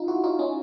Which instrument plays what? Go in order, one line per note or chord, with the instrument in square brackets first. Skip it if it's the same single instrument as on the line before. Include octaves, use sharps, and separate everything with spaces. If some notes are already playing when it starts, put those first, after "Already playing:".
Already playing: [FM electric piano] D#4 F4
E4 F#4
D#4 F4
C#4 D#4